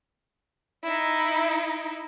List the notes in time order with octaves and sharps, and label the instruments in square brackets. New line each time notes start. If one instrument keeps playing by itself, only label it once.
[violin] D#4 E4